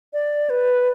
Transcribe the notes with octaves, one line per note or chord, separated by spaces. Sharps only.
D5
B4